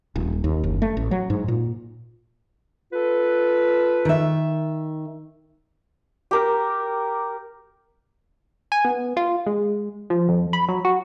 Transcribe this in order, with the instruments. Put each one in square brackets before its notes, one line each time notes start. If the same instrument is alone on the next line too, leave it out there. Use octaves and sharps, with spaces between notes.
[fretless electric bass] D#1
D#2
F#1
A3
A1
F#3
G#2
A#2
[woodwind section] F4 A4 B4
[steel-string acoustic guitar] D#3 E5
[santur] G4 A#4
[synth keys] G#5
B3
F4
G#3
F3
F2
B5
F#3
F#4